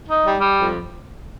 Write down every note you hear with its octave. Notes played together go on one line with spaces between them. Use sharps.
D#4
G3
G3
F2